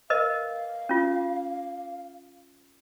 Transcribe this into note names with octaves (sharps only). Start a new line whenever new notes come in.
A#4 B4 D#5 F5
C#4 F4